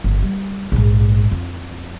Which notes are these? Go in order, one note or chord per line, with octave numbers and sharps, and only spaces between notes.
G1
G3
A#1 G#2
F2